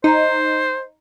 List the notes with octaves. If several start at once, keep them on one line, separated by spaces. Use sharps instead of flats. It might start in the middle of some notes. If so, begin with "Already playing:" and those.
D#4 C5